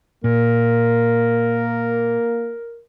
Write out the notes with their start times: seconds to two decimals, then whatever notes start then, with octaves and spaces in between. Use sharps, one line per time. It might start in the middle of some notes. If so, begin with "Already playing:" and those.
0.24 A#2 A#3 A#4